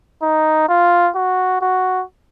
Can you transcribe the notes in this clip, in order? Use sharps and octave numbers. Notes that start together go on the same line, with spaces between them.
D#4
F4
F#4
F#4